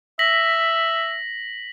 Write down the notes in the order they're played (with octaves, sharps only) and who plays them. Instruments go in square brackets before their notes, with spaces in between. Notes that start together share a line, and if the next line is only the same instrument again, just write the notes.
[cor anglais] E5 [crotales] A#6 B6 F#7